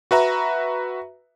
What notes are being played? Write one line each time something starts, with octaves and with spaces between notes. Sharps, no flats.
F#4 B4 E5 A#5